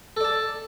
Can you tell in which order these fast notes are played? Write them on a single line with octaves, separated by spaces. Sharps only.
A4 D5 A5